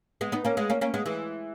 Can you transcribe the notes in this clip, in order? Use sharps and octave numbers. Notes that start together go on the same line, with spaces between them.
G#3 B3
B3 D#4
A#3 C#4
G#3 B3
A#3 C#4
A#3 C#4
G#3 B3
E3 G#3